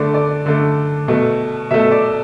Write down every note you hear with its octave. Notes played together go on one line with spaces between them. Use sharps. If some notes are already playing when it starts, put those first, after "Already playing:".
Already playing: D3 A3 D5
D5
D3 A3
B2 A3
B2 A3 E5
D5